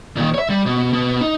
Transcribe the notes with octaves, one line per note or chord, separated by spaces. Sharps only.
A#2 D#3
C#5 E5
G3
B2
B2
D#4